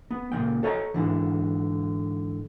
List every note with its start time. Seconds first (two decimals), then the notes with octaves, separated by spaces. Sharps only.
0.11 B3
0.32 C#2 A#2 D#3 A3 G5
0.63 A4 C#5 D#5 A5 A#5
0.94 G#2 D3 E3